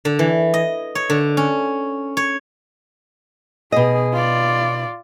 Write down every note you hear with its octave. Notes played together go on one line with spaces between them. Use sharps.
D3
E3
D#5
C#5
D3
C#4
C#5
B2 G#4 D#5
F4 D5